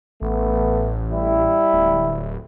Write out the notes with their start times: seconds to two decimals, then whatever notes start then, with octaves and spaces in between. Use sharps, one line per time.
0.22 A1 A3 B3
1.12 G3 E4
1.73 D1